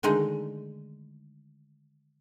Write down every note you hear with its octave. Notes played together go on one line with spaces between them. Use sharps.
D3 D#3 G#3 A3 D#4